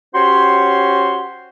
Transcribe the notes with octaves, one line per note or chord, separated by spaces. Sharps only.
C#4 F#4 G4 C5 C#5 C6